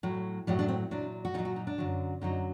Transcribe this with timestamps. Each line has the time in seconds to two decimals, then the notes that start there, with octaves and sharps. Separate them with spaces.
0.03 A2 F#3
0.47 A2 F#3 G3
0.59 D4
0.68 C4
0.91 A#2 F#3 D4
1.25 F#4
1.34 A#2 D#4
1.39 F#3
1.45 F#4
1.56 D#4
1.67 D4
1.78 F#2 D3 F#3
2.21 F#2 D3 F#3 D#4